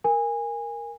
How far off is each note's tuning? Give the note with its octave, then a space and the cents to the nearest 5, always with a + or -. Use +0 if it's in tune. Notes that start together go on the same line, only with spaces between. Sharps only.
A#4 +0 G#5 -20